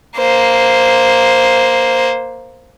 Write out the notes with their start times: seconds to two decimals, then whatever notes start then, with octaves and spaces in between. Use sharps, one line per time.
0.17 A#3 C5